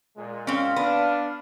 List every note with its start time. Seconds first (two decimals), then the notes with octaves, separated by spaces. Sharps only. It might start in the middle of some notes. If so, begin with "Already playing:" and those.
0.15 A#2 G#3
0.47 C4 C#4 F5
0.76 B3 D4